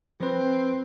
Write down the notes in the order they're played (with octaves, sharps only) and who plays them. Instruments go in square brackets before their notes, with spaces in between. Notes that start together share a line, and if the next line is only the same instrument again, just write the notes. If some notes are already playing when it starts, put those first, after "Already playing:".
[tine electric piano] F3 B4 [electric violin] C4